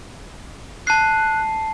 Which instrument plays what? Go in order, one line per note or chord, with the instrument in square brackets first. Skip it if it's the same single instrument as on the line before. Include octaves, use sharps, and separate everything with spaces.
[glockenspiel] A5 C7 [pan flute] F#6